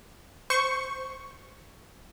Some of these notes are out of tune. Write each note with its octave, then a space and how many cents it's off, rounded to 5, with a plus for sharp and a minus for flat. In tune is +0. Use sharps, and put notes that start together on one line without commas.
C5 -5 C#6 +0